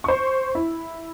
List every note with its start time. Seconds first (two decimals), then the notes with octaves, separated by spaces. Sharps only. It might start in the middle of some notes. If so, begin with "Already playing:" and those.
0.04 C5 C#6
0.55 E4